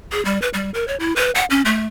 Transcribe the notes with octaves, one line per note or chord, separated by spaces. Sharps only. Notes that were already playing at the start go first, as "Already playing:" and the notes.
G#4
G3
B4
G3
A#4
C#5
E4
B4
F#5
C#4
A3